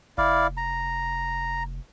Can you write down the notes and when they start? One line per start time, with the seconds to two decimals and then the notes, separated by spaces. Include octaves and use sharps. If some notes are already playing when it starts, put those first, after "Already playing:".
0.18 F1 E4 D5 F5
0.57 A#5